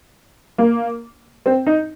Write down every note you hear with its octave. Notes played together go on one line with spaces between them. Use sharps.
A#3
C4
D#4